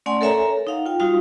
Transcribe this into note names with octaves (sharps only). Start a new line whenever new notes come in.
A3 C#4 D5 F#5 G#5 C6
A4 A#4 C#5 E5 G#5 A#5
D#4 F5 F#5
F4 G5
G3 D#4 F4 F#4 F5 D#6